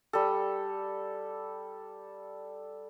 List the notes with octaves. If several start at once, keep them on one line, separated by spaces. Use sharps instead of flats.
G3 A4